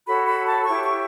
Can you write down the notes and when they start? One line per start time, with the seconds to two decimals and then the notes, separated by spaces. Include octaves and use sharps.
0.07 F#4 A4 C#5 B5
0.27 B5
0.47 A5
0.65 E4 G4 C#5 C#6
0.84 C#6